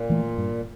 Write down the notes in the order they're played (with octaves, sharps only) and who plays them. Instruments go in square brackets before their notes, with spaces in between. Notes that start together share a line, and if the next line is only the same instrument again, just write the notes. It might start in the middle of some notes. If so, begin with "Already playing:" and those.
Already playing: [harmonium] A#2
[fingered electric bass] E3 A3
G2